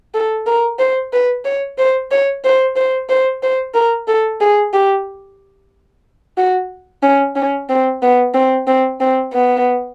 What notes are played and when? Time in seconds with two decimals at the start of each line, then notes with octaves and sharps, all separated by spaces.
0.14 A4
0.46 A#4
0.79 C5
1.13 B4
1.45 C#5
1.78 C5
2.11 C#5
2.44 C5
2.76 C5
3.09 C5
3.43 C5
3.75 A#4
4.08 A4
4.41 G#4
4.74 G4
6.38 F#4
7.03 C#4
7.36 C#4
7.69 C4
8.02 B3
8.34 C4
8.67 C4
9.00 C4
9.33 B3